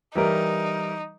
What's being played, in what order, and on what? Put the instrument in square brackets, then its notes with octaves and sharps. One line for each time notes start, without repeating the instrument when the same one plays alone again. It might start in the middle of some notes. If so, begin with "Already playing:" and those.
[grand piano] E3 G3 A#4 [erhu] D#4